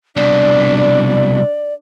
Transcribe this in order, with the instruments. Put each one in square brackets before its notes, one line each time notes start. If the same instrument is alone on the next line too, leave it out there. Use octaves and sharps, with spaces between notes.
[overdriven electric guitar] C2 B2 [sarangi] D4 [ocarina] D5